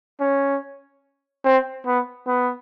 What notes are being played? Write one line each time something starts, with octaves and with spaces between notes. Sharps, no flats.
C#4
C4
B3
B3